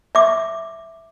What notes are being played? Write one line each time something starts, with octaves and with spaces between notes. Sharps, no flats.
E5 D6